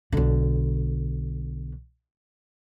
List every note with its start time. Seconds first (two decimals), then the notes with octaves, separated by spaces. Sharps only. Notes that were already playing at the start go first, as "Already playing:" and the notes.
0.12 B1 D3